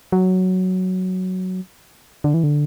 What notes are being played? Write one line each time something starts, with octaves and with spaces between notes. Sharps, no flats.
F#3
D3
E3
D3